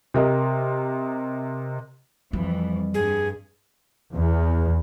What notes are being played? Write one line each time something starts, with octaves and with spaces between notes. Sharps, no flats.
C3 A#4 D#5
F2 E3 G3
G2 G#4
E2